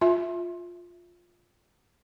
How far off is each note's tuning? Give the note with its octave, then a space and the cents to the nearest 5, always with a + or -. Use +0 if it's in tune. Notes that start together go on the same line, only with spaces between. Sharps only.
F4 +10 E5 +0